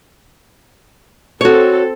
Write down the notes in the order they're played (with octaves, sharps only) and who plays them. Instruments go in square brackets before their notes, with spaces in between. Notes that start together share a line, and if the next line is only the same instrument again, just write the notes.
[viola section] C4 A4 [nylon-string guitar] F#4 C#5